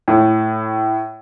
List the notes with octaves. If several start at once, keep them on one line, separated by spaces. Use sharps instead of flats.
A2